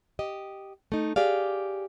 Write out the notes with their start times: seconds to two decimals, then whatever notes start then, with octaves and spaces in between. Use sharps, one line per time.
0.19 G4 D#5
0.92 A3 D#4
1.16 G4 G#4 D5 F5